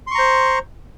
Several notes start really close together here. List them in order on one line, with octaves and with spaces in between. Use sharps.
C6 C#6 A#5 C5